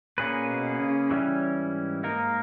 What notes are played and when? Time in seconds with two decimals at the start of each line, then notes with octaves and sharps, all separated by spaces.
0.18 A#2 A#3 C#4 G#4 B4
0.48 B2
0.79 C#3
1.11 E3 G3 C#4
1.57 G#2
2.04 A#3 D#4 A#4